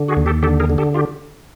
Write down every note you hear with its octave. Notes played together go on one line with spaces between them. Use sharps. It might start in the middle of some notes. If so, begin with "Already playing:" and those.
Already playing: D3
F#4 G#4
D#2
G4 A4
D3 G4 A4
G#4 A#4
D3
G4 A4
F4 G4